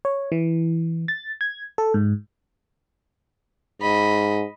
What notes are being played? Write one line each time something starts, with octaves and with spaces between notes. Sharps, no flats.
C#5
E3
A6
G#6
A4
G#2
G#2 D#5 B5